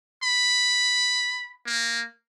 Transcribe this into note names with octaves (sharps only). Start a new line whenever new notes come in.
B5
A#3